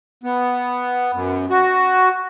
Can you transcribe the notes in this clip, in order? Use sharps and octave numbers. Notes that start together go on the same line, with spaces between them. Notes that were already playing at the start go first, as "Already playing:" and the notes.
B3
F#2
F#4